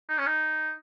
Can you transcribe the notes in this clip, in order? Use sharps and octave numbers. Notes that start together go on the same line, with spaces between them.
D#4
C#4
D#4